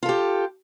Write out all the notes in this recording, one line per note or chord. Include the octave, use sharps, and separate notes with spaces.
F4 G4 A4